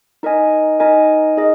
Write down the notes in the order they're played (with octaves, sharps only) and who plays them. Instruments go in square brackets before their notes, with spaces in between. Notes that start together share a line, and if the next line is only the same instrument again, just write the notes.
[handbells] D#4 A#4 D#5 G#5
D#4 A#4 D#5 G#5
D#4 G#4 D#5